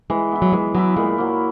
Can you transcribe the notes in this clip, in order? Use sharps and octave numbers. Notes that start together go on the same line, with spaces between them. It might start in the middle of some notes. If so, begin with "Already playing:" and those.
E3 G#3
B3 E4
F#3
E3 G#3
F#3 B3 E4
A#2 G#3
F#3 A#3